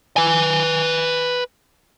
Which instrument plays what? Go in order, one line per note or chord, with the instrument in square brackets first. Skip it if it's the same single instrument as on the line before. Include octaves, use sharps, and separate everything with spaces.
[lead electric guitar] B4 G#5